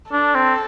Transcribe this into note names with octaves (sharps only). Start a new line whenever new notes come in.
D4 A4
C4